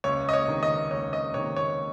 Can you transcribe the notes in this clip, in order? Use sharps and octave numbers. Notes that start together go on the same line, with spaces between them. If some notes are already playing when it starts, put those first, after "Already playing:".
C#2 C#5
D#5
C#5
C3 D#3
D#5
C#2 C#5
D#5
C3 D#3 C#5
C#5